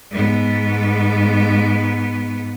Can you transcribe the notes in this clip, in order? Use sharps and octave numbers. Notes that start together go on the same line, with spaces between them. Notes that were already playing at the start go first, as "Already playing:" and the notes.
G#2 B3